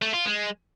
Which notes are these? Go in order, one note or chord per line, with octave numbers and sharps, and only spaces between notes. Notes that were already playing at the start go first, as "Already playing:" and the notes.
A3
F4
G#3